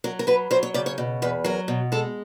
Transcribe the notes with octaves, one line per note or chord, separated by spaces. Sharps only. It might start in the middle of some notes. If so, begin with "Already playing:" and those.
F#3 A#4
A#4
F#3 B4
F#3 C5
C#5
C#3 D5
C#5
B2
E2 B4
F#3 A#4
B2
G#3 A4